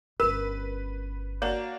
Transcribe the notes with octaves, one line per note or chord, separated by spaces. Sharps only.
G1 C#4 A#4 B4
A#3 D4 F#4 C#5